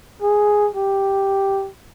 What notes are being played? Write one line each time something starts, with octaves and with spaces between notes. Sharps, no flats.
G#4
G4